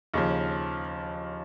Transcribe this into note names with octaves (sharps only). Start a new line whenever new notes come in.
D#2 C#3 F3